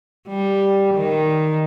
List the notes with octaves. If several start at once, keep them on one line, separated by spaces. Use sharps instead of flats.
G3
D#3